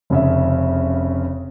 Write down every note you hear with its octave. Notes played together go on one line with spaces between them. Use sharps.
F1 C#3 E5